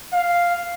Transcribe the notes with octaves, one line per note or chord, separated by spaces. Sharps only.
F5